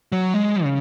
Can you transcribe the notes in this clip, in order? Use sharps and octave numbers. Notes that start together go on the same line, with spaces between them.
F#3
G#3
C#3